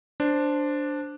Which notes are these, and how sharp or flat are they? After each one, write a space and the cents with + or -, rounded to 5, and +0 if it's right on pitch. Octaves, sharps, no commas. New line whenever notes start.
D4 +0 C5 +0